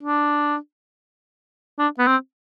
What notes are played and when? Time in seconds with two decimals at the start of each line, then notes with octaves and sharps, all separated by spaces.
0.03 D4
1.79 D4
1.99 B3
2.07 C4